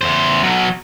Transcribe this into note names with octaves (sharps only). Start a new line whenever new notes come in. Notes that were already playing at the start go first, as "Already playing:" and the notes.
E2 C5
B2 F#3